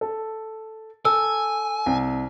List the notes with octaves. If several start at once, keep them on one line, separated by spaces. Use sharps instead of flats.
A4
A4 G#5 E6
C2